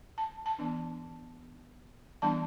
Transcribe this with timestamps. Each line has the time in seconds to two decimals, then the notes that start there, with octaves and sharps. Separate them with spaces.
0.18 A5
0.46 A5
0.59 E3 B3 D4
2.22 E3 G3 B3 D4 A5